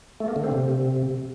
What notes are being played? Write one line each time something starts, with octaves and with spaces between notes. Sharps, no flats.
A3
A#3
D3
C4
C3